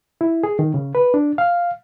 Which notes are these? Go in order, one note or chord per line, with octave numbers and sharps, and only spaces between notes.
E4
G#4
D#3
C#3
B4
D4
F5